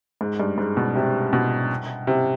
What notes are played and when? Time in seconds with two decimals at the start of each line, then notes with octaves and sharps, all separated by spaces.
0.21 G#2
0.40 G2
0.58 G#2
0.77 B2
0.95 C3
1.33 B2
2.07 C3